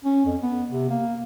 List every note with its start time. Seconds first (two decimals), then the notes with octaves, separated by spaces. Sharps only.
0.05 C#4
0.26 F2
0.42 B3
0.70 C3
0.90 A#3